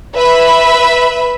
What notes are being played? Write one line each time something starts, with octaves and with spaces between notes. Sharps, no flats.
B4 E5 B5